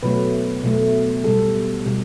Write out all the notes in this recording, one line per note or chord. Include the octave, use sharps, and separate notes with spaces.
B2 F#3 A3 B4
B2 F#3 A3
B2 G3 A4
B2 G3